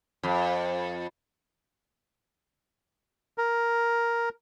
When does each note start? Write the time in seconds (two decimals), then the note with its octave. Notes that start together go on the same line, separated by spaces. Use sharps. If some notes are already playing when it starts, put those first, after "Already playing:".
0.23 F2
3.38 A#4